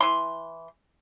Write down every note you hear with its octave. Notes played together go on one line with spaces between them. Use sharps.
E3 C6